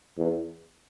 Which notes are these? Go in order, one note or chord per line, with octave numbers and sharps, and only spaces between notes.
E2